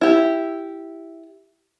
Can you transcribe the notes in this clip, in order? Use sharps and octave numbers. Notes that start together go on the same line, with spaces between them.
E4 G4